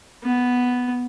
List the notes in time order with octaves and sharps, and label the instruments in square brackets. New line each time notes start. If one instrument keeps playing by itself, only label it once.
[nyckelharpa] B3